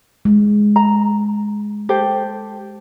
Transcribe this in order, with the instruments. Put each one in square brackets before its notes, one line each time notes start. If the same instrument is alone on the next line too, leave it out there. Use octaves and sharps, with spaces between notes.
[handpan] G#3
[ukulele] A#5
G4 A4 C5